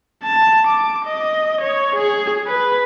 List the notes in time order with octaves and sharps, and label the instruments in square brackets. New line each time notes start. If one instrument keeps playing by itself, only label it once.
[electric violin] A5
D6
D#5
C#5
G#4
B4